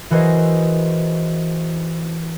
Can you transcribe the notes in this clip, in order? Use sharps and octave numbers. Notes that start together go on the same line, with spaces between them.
E3 F#4 G#4 A#4 C5 D#5